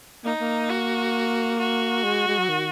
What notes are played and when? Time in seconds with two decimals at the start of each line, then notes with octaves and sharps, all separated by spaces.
0.24 A#3 D#4
0.41 A#3
0.69 F#4
1.59 F#4
2.04 G#3
2.27 G#3
2.38 F#3
2.49 D#3